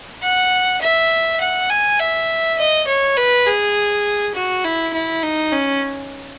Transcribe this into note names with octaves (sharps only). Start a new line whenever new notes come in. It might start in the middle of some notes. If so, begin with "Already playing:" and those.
F#5
E5
F#5
G#5
E5
D#5
C#5
B4
G#4
F#4
E4
E4
D#4
C#4